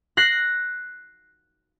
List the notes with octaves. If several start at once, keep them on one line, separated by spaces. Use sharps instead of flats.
F#6 A#6 C7